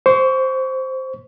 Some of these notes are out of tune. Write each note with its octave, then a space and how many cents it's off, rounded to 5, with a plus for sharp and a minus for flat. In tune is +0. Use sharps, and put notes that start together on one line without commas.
C5 +0 C#6 +30